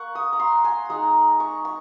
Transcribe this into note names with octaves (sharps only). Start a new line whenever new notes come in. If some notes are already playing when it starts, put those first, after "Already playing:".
Already playing: A#3 F#5 C#6
D#6
A#5
C6
G#5
G#3 D#4 A#5
C#6
C#6